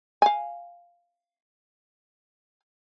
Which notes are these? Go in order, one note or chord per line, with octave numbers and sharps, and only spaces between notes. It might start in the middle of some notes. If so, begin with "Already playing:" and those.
F5 G#5